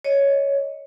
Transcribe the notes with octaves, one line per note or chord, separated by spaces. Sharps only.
C#5 D#5